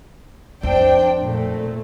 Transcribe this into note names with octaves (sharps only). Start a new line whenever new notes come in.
F2 C4 D4 G5
A#2 A3